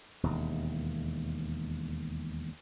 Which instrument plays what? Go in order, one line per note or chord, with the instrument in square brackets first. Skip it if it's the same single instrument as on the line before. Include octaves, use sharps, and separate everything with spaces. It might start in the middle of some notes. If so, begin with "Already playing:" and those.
[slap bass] E1 D#2